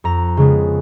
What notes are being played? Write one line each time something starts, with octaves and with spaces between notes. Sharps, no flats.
F2 A#5
C#3 G#3 B3